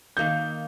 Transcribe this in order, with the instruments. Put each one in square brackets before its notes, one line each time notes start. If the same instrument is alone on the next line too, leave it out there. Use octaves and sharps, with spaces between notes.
[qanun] D#3 A#3 D#4 [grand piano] G6